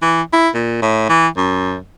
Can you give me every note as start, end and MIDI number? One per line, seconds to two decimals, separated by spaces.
0.02 0.22 52
0.33 0.49 64
0.54 0.82 46
0.82 1.04 45
1.09 1.28 52
1.37 1.78 42